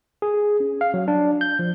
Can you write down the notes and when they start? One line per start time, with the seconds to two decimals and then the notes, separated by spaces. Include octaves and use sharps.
0.22 G#4
0.60 C#4
0.81 F5
0.94 F#3
1.08 D4
1.41 G6
1.59 F3